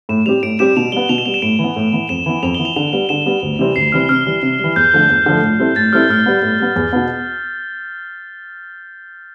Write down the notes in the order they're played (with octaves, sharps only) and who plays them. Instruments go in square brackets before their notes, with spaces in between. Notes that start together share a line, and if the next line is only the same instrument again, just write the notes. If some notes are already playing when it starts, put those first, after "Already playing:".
[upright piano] A2 [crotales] E7
[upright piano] G3 C4 G4 [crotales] F7
[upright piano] A2 [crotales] D7
[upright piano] G3 C4 G4 [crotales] E7
[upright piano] B2 [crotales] F7
[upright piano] G3 B3 [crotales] G7
[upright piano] B2 [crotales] F7
[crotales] E7
[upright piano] G3 B3 [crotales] F7
[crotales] E7
[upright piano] A2 [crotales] D7
[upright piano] E3
B3
A2
E3 B3
[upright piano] F2 [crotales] E7
[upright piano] E3 B3
[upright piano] F2 [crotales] F7
[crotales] G7
[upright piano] E3 B3
[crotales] F7
[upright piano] D3 [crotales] F7
[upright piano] G3 B3 [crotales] G7
[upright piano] D3 [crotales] E7
[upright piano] G3 B3
D2
C3 E3 G3 C4
[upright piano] D2 [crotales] C7
[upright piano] C3 E3 G3 C4 [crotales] F6
[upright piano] C3 [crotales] F6
[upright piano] E3 G3
C3
E3 G3
[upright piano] E2 [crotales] G6
[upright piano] D3 F3 A3
E2
D3 F3 A3
A2
G3 C4 E4 A4
[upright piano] A2 [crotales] A6
[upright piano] G3 C4 E4 A4 [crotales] F6
[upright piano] A2 [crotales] F6
[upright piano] G3 B3
A2
G3 B3
E2
B2 B3